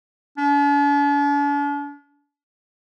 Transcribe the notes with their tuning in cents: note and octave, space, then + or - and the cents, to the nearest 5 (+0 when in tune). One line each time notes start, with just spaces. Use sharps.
D4 -45